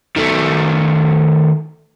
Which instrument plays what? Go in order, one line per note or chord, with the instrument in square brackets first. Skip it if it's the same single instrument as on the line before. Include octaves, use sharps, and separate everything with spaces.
[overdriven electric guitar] D#3 A3